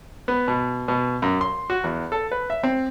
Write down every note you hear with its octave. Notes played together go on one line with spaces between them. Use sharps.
B3
B2
B2
F#2
C6
F#4
E2
A4
B4
E5
C4